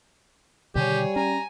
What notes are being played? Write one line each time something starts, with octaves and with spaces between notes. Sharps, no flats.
B2 D3 D#3 G3 G4 G#4 C#5
C#4 G#5 A#5